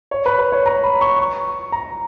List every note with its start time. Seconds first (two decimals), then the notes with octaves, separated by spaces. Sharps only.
0.11 C#5
0.26 B4
0.39 B4
0.52 C#5
0.66 A#5
0.83 B5
1.01 C#6
1.19 C#6
1.72 A#5